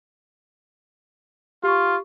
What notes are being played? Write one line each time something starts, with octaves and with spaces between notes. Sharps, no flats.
F4 G4 C#6